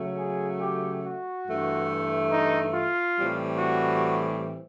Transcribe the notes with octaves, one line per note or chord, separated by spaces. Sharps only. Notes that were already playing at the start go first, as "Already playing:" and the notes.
Already playing: C#3 F#3 A3 C#4
G#4
G4
F#4
G2 E3 A3
D#4
F4
A2 E3 G3 C4
F#4